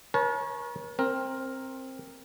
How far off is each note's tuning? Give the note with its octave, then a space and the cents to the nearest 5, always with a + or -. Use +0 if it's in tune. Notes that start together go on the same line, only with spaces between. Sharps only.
A#4 +40 C#5 -15 A5 -35
C4 +15 A#4 +0